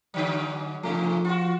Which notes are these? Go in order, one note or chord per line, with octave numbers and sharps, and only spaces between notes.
G#2 D3 F#3
G#2 C3 F3 A3
F4 F#4